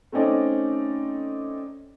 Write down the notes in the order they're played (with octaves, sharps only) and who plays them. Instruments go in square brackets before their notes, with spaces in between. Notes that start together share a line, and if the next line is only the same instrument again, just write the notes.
[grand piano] A3 C4 C#4 D#4 D5